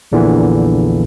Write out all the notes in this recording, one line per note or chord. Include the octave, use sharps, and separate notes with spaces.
A#1 E2 A#2 D3 E3